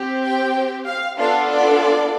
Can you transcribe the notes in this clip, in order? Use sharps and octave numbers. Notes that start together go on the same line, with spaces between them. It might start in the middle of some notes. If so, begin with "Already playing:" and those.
Already playing: C4 G4
G5
F5
B3 D4 F4 A4 F5
D5